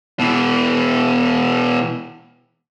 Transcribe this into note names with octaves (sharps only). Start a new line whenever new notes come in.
B2 E3